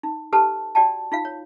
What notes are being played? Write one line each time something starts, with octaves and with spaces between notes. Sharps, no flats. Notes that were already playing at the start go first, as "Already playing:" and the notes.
D#4
G4 A4 B4 C5 A5
F#4 D5 G5 A5
D#4 F4 F5
C#5